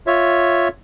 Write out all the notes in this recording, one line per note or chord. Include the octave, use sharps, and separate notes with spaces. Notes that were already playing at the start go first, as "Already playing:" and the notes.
F4 C#5 E5